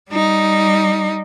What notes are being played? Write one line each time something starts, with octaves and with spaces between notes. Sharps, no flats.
G3 D#4